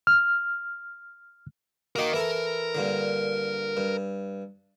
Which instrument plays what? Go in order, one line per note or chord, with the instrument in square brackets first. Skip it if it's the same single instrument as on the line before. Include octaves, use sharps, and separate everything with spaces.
[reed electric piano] F6
[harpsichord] A#3 F#4 D6 [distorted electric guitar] A#4 D#5
[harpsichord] E3 E4 A4 [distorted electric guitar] A#4
[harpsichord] G2 A#2 D3
G2